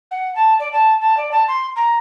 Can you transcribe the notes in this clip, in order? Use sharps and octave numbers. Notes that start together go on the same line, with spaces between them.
F#5
A5
D5
A5
A5
D5
A5
C6
A#5